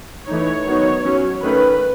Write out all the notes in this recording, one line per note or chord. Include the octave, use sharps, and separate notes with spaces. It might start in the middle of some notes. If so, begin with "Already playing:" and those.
E3 A3 D#4 C#5
D#3 F#3 B3 D#4
F#3 C#4
D#3 A3 C#4 B4